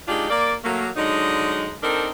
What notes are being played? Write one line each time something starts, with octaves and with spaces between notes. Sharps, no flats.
G#3 D4 D#4 F4 G4
A#3 D5
F#3 A3 A#3
D3 F#3 G#3 D#4
C4 D4 D#4 A4 A#4